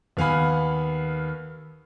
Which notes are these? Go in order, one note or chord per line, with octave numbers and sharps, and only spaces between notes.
D#2 B3 F5 F#5 G#5 B5